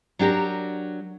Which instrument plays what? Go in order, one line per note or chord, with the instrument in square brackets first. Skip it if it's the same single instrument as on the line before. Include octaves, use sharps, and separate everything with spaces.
[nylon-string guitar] F#3 D4 G4 A#4